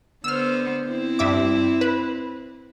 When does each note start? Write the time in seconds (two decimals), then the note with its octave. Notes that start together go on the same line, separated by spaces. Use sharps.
0.24 D3 B3 C5 E6 F6
0.89 C4 E4
1.19 G2 E5 D6
1.81 B4